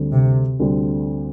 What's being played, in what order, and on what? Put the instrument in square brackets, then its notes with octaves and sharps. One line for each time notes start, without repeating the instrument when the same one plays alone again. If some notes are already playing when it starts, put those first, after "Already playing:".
Already playing: [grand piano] D2 D3 G3 C4
[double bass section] C3
[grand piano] D2 D3 G3 C4